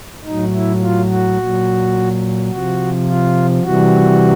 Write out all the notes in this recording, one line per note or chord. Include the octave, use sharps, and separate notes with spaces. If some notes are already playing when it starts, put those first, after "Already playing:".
A2 F#3 D#4
E4
F4
F#4
A#2 F#3
C3 F3 F#4
F4
C3 E3 G3 F#4